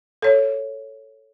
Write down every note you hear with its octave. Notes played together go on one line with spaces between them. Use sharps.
A4 C#5